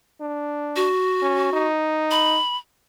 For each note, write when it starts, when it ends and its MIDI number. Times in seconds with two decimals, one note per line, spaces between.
0.21 0.89 62
0.76 1.67 66
1.22 1.49 61
1.53 2.39 63
2.11 2.57 83